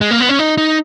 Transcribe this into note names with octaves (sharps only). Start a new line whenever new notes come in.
G#3
A#3
B3
C#4
D#4
D#4